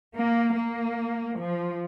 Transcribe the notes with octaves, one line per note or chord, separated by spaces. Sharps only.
A#3
A#3
F3